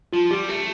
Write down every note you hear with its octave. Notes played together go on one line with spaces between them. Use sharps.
F3 F4
G3 G4
A3